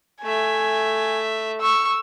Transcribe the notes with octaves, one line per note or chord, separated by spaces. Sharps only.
A3 E5 G#5
C#6 E6